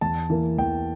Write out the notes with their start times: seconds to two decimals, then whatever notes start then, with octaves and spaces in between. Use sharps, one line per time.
0.01 E2 A5
0.30 E3 A#3
0.58 E2 G5